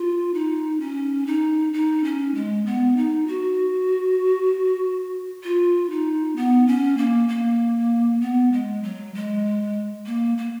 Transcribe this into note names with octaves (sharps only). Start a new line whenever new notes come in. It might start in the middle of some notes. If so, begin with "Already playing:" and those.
Already playing: F4
D#4
C#4
D#4
D#4
C#4
G#3
B3
D#4
F#4
F4
D#4
B3
C#4
A#3
A#3
B3
G#3
F#3
G#3
A#3
A#3